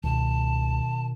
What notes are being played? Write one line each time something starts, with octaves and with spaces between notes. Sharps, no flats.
C#2 B2 D#3 A5